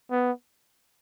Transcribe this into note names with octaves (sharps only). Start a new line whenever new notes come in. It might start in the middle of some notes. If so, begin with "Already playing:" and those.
B3